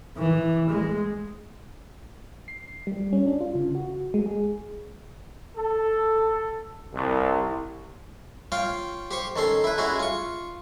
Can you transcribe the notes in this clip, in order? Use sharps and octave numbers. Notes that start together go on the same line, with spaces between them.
E3
G#3
C7
G3
C#4
D4
F4
C#3
F#4
G#3
G#4
A4
C2
F4 C#5 F5 G5
G4 C5 C#6
D#3 C#4 A4 C6
E4 B4
G#3 C#4 E4 F#4 G#4
F4 C#6